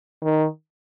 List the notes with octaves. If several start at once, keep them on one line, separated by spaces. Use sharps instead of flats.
D#3